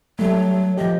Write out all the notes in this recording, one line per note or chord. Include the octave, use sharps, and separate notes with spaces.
F#3 G3 A3
F3 G4 D#5